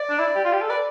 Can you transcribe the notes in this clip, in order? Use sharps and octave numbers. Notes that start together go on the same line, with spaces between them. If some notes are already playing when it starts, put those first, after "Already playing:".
Already playing: D5
D4
E4
G4
F4
G4
A4
B4 D5